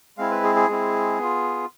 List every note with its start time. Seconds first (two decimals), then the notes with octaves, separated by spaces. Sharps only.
0.18 G#3 C4 E4 F5
0.31 B4
0.44 G#4
0.56 G#4
0.69 G#3 C4 E4
1.19 B3 F4